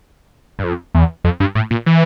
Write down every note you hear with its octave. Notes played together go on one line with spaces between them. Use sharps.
G2
F2
E2
F2
G2
A2
A#2
E3